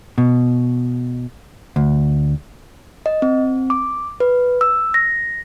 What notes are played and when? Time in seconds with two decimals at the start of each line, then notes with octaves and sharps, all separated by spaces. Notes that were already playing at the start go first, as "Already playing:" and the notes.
0.18 B2
1.76 D2
3.06 D#5
3.22 C4
3.70 D6
4.20 B4
4.61 E6
4.94 A#6